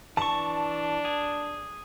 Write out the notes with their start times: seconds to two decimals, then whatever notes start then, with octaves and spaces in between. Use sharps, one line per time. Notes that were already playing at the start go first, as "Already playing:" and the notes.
0.17 E3 D4 A5 C#6
1.05 G#4